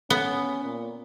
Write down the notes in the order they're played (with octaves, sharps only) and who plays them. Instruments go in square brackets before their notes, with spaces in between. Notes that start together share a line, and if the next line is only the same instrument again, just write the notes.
[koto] B3 [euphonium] C#4
[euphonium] A#2